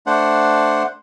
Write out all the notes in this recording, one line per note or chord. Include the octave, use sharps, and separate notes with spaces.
A3 D4 C5 F#5